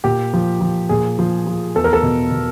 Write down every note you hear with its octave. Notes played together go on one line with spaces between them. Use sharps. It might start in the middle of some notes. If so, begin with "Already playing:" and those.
A#2 G4
F3
F3
A#2 G#4
F3
F3
E2 A4
A#4
A4
B2
B2